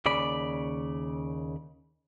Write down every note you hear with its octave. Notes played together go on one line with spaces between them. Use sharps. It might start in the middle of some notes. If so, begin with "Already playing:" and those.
D#2 C#3 D5 B5